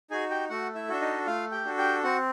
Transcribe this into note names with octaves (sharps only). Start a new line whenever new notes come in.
D#4 F#4 G#4 G#5
G4 G5
A3 F#4 F#5
E4 E5
D4 F#4 A4 E5
D#4 D#5
A3 F4 F5
G4 G5
D4 F#4 A4
G4 G5
C4 F#4 F#5